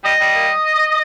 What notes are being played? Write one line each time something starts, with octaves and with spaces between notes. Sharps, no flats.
G3 D#5
G3
A#3